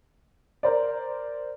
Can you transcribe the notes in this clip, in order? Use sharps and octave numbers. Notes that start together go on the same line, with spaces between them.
A#4 C5 D5